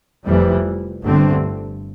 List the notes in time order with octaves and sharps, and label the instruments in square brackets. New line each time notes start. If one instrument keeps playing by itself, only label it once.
[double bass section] F1 F2 E3 G3
G1 G2 D3 A3 C4